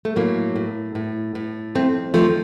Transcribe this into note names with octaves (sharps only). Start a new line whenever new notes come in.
A3
A2 F#3 A#3
A2
A2
A2
F2 A3 C4
D#3 F3 A3